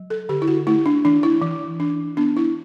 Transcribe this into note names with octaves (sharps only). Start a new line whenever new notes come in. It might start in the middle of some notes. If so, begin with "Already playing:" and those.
Already playing: F#3
A4
D3 G4
E4
F#4
A3 E4
D4
E3 D4
E4
E3
D4
B3 D4
E4